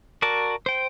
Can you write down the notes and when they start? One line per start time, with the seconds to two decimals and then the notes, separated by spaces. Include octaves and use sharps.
0.22 F#4 A#4 D5 A5
0.66 C5 G5